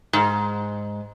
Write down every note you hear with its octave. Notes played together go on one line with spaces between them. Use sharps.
G#2